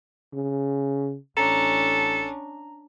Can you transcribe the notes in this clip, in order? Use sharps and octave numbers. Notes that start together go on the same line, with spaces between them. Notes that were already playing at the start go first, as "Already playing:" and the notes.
C#3
A1 C#4 D4 A4 A#5